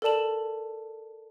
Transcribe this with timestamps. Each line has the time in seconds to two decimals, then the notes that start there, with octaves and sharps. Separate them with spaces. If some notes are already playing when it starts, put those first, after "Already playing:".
0.02 A4 A#4 D5 A5 E7 F#7